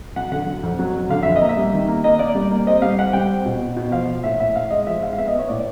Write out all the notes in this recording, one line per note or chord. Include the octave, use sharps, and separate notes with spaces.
F#3 F#5
D3 F#5
F#3
F2
F#3
F#3
D3 F5
F2 E5
D#5
A#3
E5
G3
D#3
A#3
A#3 D#5
A#3 D5
G3
A#3
C4 D#5
G3 F5
C4 F#5
G3 G5
C4
B2
B2
B2
F3 F5
F3
A2 E5
A2 E5
A2 F5
G#3 D#5
F3 E5
G#3 F5
F5
B3 E5
D#5
B3 C#5
A2 D5